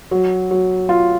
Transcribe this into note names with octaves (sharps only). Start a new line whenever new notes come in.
F#3
F#3
F4